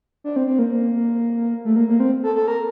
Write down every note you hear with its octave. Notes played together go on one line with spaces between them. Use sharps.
D4
C4
C4
A#3
A3
A#3
A#3
C4
A4
A4
A#4